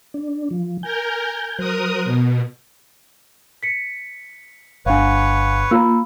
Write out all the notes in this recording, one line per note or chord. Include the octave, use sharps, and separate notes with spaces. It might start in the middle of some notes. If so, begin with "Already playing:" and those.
D4
F3
A#4 G#5 G6
F#3 A#4 C5 D#6 F#6
B2
B6 C#7
G1 D4 B4 C#5 F5 F#5 G#5
A#3 F4 A#5 B5 E6